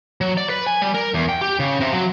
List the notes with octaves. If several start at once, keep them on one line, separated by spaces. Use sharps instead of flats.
F#3
D5
B4
G#5
G3
A#4
E2
G5
G4
C#3
C3
F#3